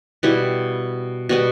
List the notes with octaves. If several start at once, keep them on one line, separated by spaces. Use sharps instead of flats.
B2 G3 B3 E4
B2 G3 B3